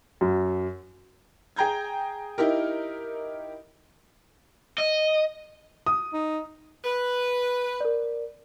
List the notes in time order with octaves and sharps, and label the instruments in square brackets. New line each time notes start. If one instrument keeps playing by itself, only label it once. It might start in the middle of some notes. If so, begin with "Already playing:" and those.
[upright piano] F#2
[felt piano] G#4 G5 A#5 G6 G#6
D#4 E4 G4 A#4
[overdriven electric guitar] D#5
[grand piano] D#6
[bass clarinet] D#4
[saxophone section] B4
[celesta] A#4 D5